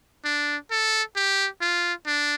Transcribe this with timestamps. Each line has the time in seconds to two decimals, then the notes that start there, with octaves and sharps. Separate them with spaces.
0.25 D4
0.71 A4
1.16 G4
1.61 F4
2.07 D4